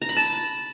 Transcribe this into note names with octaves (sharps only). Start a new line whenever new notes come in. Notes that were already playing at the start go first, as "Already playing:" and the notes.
A#5
B5
A5